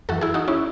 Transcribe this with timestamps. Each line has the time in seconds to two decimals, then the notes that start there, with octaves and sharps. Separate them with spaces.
0.09 F#2 E3 F#4 A4
0.21 E4 G#4
0.34 D#4 F#4
0.48 C#4 E4